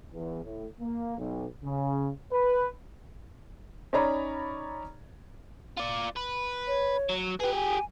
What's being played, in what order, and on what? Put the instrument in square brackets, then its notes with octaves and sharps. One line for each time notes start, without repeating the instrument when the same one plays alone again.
[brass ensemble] E2
A2
A#3
B1
C#3
B4
[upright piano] C#4 D#4 C#5 D5 A#5 B5
[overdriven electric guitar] F4 D5
B4
[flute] C#5
[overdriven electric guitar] F#3
[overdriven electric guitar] G4 G#4 [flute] B4
[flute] G#5